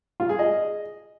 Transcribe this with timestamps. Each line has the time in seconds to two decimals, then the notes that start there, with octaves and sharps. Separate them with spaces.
0.20 F4
0.29 G#4
0.39 D#5